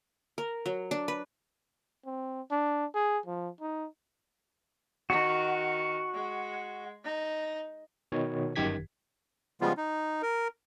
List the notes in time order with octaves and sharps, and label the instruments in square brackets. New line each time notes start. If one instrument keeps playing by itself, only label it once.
[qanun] A#4
F#3
D4
B4
[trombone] C4
D4
G#4
F3
D#4
[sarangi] D#3 [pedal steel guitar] F#4
[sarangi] G#3
D#4
[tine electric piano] B2 D#3 C#5
G1 F#2 D#3 G4 G#6 B6
[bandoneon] C#3 F3 G3 G#3 B3 F4
D#4
A#4